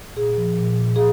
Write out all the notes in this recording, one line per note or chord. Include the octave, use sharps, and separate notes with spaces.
A#2 G#4
F3
A#2
A#2
G#4